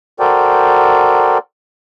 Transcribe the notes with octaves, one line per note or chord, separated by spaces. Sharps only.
F#4 A4 A#4 C5 D5 G5